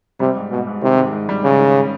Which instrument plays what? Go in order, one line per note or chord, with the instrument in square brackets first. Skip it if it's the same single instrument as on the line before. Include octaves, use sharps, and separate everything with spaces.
[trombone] C3 [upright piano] G3
[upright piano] G#2
[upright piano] G#2 [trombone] B2
[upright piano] G#2
[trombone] C3 [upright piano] D#3
[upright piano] G#2
G#2
G3
[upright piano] G#2 [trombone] C#3
[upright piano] D#3